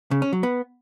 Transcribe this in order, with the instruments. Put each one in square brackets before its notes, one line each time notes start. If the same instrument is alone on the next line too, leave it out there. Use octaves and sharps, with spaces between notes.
[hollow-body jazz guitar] C#3
C#4
F#3
B3